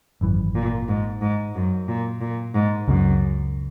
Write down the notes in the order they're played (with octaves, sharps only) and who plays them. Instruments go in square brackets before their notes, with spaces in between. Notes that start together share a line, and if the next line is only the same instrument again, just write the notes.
[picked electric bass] G#1 F#2 E3
[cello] A#2
G#2
G#2
F#2
A#2
A#2
G#2
[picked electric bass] C#2 C#3 G#3 C#4 [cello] F#2